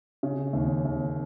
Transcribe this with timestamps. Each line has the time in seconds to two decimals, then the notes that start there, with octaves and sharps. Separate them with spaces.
0.23 C#3
0.53 D#2
0.85 D#2